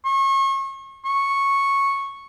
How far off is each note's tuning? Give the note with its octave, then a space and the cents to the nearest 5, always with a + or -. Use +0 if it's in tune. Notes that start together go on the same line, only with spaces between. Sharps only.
C#6 -35
C#6 -5